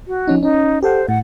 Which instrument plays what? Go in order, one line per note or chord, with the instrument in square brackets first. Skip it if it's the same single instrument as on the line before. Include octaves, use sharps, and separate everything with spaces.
[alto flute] F#4
[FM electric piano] F3 C#4 D#4
[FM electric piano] C#4 [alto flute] D#4
[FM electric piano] G4 A4 F#5 [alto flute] C5
[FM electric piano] A2 [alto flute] F#5